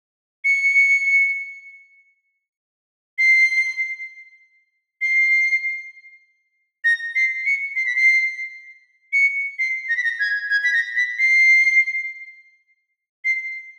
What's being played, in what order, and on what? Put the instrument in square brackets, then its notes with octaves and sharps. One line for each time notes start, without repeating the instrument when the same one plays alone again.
[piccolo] C#7
C7
C7
A#6
C7
C#7
C7
B6
C7
C#7
C7
A#6
B6
A#6
G#6
G#6
B6
A#6
B6
C7
C7